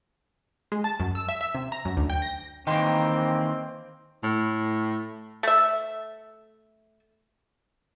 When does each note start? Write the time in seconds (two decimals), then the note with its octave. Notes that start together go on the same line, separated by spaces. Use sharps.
0.72 G#3
0.84 A5
1.00 F#2
1.15 E6
1.29 E5
1.41 E5
1.55 C3
1.72 A#5
1.85 F#2
1.97 D2
2.10 G5
2.22 A#6
2.67 D#3 E3 A#3 C4 D#5 G5 C6
4.23 A2
5.43 A3 E5